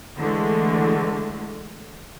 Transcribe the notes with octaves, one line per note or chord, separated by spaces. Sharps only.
D3 E3 G#3 A3